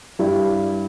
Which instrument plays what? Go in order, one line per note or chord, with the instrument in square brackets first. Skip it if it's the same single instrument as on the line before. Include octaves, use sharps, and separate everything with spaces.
[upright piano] G2 G3 E4 G4 D5